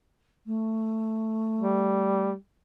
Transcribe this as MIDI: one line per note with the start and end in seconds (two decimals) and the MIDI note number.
0.46 2.31 57
1.58 2.35 55